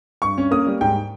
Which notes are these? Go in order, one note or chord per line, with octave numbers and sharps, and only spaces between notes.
G2 C#6
C#4
A#3 D#6
G3
G#2 G5